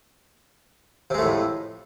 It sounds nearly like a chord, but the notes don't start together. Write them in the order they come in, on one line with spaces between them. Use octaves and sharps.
C3 G#3 A3 A2 F2